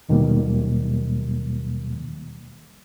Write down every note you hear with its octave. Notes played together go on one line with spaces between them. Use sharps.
D#2 B2 D#3 F#3 G3 A#3